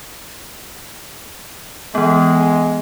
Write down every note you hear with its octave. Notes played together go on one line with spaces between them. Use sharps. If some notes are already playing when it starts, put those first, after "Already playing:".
E3 G#3 B3